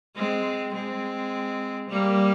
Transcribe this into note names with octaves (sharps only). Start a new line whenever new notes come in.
G#3 C4
G#3 C4
G3 A#3